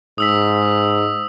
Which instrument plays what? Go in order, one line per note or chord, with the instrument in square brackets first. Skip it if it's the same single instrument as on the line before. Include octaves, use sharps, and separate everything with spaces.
[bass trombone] G#2 [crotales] D#6 E6 B6